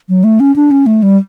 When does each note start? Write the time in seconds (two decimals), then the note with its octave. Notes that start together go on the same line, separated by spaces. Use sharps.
0.09 F#3
0.24 A3
0.40 C#4
0.56 D4
0.71 C#4
0.86 A3
1.03 G3